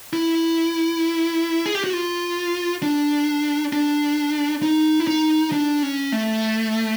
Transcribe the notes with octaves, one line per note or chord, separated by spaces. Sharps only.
E4
G#4
G4
F#4
F4
D4
D4
D#4
E4
D#4
D4
C#4
A3